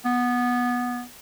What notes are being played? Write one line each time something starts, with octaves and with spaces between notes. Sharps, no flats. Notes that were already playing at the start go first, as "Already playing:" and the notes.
B3